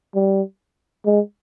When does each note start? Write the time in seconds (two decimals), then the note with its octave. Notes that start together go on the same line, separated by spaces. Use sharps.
0.15 G3
1.06 G#3